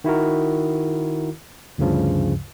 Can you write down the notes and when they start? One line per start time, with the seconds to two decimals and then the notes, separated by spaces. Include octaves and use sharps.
0.04 D#3 E4 F#4 A#4
1.78 D2 G2 C#3 F3